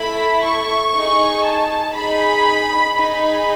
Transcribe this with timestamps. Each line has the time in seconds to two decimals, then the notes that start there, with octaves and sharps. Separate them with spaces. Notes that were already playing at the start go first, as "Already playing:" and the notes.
Already playing: A3 E4 A4 B5
0.43 C#6
0.94 D#4 G#4
1.45 A5
1.95 D#4 G#4 B5
2.97 D#4 G#4 B5